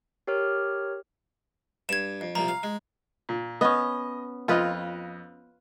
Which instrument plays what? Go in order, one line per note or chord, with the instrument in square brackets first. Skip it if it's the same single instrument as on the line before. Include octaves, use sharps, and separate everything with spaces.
[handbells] G4 A#4 C#5 F6
[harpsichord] G2 [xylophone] G#6 E7
[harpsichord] F2
[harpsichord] C2 A#2 F3 [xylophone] A#5
[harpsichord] F5
G#3
[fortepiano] A#2
[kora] B3 C#4 [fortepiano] D#5
[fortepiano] F2 D#5 [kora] F4 B4